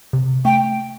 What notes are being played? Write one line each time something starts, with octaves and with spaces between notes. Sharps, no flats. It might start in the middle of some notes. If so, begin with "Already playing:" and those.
C3
A3 G5